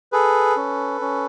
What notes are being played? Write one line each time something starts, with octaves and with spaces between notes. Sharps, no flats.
G#4 A4 B4
C#4
C#4